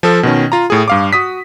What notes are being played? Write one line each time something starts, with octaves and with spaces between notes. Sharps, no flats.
F3 A4
B2 D#3 C#4
F4 A#5
A2 G#4
G2 F5 D6
F#4 D#6 B6